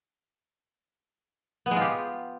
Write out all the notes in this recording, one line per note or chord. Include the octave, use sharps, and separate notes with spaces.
B3
G#3
F4
G4